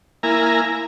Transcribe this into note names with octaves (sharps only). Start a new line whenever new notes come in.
A#3 E4 G#5 A#5